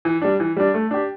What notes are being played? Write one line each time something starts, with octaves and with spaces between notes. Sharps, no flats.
E3
G3 D4
E3
G3 D4
A3
D4 G4